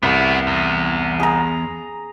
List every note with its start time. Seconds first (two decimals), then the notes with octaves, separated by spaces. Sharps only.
0.03 C2 B3 E4
0.47 E2
1.20 G#4 A#5